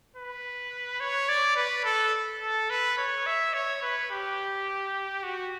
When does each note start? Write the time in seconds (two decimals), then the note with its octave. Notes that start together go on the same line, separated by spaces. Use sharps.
0.16 B4
1.00 C#5
1.29 D5
1.56 B4
1.85 A4
2.41 A4
2.70 B4
2.98 C#5
3.26 E5
3.54 C#5
3.82 B4
4.11 G4
5.23 F#4